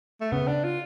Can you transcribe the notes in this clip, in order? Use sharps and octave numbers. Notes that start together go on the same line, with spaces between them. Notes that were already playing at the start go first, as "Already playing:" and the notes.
A3
C#3 B3
D4
F4